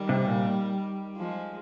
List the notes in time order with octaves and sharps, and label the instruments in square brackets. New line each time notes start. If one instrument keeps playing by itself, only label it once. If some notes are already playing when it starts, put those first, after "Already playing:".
Already playing: [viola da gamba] D#3 G3
[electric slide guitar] C3
A#2
[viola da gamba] F3 G#3